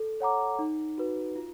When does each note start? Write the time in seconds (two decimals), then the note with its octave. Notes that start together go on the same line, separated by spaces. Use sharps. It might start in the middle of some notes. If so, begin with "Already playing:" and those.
Already playing: A4
0.20 C#5 F#5 A#5 D6
0.59 D#4
0.98 F#4 B4
1.36 F4